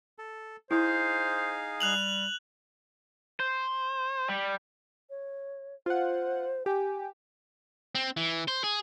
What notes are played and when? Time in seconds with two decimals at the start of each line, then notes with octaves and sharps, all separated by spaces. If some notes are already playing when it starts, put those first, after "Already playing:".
0.18 A4
0.71 D#4 E4 G#4 C5 F5
1.80 G3 F#6 F7 F#7
3.40 C5
4.28 G3
5.10 C#5
5.86 F4 C5 F#5
6.66 G4 G#5
7.95 C4
8.17 E3
8.48 C5
8.64 G#4